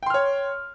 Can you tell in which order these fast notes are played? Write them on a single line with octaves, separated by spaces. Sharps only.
G5 C6 F6 C#5